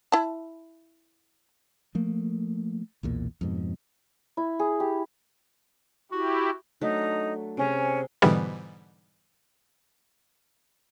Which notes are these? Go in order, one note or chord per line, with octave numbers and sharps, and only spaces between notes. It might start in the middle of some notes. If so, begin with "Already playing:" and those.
E4 A5
F3 A3 A#3
B1 E2 A#2
F2 G#2 B2
E4
G#4
G4
E4 F#4 G4
F#3 A3 D4 D#4
C3 C#4 G#4 A#5
G#2 B2 D3 E3 G3 B3